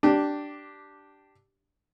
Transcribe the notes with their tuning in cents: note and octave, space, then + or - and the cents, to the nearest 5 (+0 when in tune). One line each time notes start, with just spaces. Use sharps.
D4 +0 G4 -10